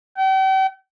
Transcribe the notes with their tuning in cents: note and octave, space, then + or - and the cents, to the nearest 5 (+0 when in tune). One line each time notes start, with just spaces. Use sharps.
G5 -40